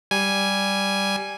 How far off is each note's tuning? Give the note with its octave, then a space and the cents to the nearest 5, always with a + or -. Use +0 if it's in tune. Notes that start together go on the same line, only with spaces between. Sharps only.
G3 +0 G#5 +0